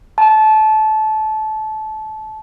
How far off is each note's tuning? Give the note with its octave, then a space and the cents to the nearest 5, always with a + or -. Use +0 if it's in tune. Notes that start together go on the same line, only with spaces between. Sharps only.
A5 -25